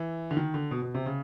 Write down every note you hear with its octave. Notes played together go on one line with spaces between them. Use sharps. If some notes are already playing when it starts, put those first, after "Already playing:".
Already playing: E3
D3
D#3
D3
B2
B2
C3
C#3